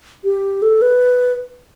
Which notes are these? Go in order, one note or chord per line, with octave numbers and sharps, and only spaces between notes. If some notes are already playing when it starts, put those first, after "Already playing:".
G4
A4
B4